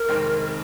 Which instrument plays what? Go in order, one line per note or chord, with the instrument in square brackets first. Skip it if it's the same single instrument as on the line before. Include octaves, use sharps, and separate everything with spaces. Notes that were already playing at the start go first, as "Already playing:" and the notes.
Already playing: [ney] A#4
[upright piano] F1 F2 D#3 G#3 C4